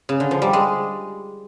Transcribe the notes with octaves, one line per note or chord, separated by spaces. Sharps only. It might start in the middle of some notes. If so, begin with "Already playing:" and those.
C#3
D3
F3
G3
G#3